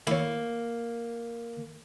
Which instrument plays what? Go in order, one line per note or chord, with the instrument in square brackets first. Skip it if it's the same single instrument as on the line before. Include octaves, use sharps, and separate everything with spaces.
[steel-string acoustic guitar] A#3 [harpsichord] E4 C#5